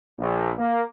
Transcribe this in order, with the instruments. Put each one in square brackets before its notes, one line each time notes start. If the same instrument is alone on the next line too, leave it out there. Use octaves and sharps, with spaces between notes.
[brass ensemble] A#1
A#3